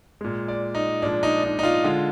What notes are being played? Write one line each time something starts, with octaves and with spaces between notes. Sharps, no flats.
A#2 G#3
D5
D#4
A#2 F3 G#3 D4
D#4
D#4
D#4
F4
D3 G#3 F4